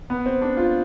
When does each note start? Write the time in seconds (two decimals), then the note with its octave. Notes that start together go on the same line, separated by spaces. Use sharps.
0.10 B3
0.26 C4
0.42 D4
0.57 F4